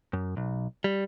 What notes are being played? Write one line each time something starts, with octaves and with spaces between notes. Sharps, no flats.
F#2
B1
G3